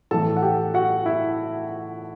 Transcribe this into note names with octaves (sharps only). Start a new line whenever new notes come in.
A2 E3 A4 A5
F#5
G4 G5
F#4 F#5
E4 E5